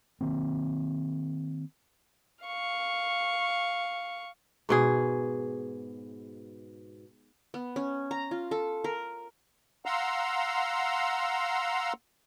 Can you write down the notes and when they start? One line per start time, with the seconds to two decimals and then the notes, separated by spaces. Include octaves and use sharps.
0.21 D#3 A#3 C4
2.45 F5 C#6
4.69 G#2 B2 G#4
7.54 B3
7.76 C#4
8.11 A#5
8.31 F4
8.51 A4
8.84 A#4
9.86 F5 F#5 A#5 C6 E6